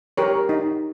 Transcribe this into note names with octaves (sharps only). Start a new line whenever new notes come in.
G4 A#4 C#5
D#4